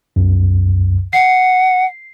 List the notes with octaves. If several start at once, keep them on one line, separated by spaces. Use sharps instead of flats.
C2 F#2
F#5 C7